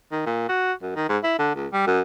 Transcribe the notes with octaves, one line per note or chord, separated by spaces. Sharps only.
D#3
A#2
F#4
F#2
D#3
G#2
E4
D3
C#2
G3
F#2